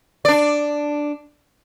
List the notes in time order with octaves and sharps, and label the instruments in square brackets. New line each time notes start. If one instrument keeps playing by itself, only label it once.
[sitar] D4 D5